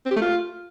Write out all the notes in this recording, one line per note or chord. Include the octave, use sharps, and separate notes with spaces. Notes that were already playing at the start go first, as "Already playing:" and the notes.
C4
G4
A3
F4